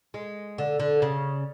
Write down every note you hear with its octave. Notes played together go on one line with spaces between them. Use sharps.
G#3
D3
D3
C#3